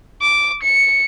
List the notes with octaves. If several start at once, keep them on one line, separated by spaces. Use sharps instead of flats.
D6
C#7